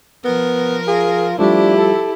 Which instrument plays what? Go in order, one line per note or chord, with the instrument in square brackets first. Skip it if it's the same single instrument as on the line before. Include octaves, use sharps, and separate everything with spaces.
[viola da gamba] F3 A#4 [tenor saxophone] B3
[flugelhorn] F4 [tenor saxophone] G#4
[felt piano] F3 G3 [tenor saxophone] A3 [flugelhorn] D4 [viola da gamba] E4 G4
[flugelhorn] A4